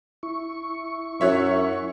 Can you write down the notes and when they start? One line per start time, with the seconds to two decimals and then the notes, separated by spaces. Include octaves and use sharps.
0.23 E4 C#6
1.21 F#2 F#4 C#5 E5